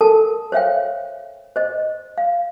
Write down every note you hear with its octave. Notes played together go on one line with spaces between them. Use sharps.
A4 A#4 A5
C5 C#5 E5 F5 G5
C5 D#5
F5